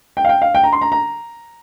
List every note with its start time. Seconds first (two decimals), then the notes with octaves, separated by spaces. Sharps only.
0.17 G5
0.25 F5
0.29 G5
0.42 F5
0.55 G5
0.63 A#5
0.73 C6
0.82 A#5
0.92 A#5